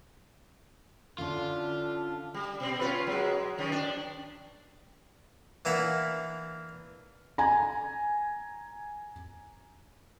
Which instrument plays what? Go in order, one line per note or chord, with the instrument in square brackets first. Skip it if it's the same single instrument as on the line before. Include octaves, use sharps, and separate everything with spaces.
[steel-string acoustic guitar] D3 C#4 E4 [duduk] D4 [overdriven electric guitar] F4 [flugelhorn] A4
[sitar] G3
B2 C4
C#4 F4 B4
F#3 G#3
F#2 D#3 F3
D4
[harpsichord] E3 A#3 D4 A#4 E5 F#5
[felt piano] G#5 A#5